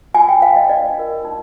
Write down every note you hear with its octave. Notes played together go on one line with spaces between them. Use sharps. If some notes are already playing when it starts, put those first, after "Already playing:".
F4 G#5
G5
C5 F5
D#5
D4 D5
F4 A#4
D#4